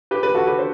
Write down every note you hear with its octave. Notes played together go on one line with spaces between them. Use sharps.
G4 B4
G4 B4
F#4 A4
G4 B4
C5